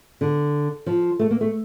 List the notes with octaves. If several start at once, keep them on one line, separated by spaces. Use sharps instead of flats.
D3
F3
A3
A#3
A3